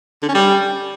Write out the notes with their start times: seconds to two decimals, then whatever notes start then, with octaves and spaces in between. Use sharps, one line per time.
0.23 D3
0.28 C#4
0.34 G3